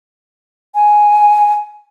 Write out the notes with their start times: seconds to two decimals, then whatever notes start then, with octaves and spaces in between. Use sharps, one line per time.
0.75 G#5